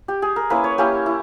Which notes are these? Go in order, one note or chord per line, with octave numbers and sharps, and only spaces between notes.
G4
G#4
A#4
A#3 C#4 E4 B4
C#5
A#3 C#4 E4 G4
E4